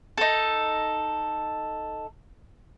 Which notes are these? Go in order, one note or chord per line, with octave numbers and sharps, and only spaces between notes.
D#4 A4